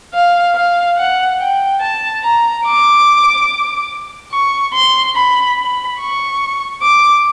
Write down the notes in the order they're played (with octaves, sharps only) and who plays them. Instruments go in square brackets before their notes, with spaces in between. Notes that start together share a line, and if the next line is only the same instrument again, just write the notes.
[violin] F5
F5
F#5
G5
A5
A#5
D6
C#6
C6
B5
B5
C#6
D6